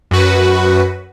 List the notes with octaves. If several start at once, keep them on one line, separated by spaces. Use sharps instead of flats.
F#2 F#4 B4